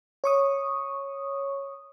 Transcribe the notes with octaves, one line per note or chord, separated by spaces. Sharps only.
C#5 C#6 D#6